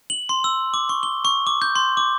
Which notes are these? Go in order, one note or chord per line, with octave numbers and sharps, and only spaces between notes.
F#7
C6
E6
D6
C#6
G7
C#6
D6
G6
C6
D6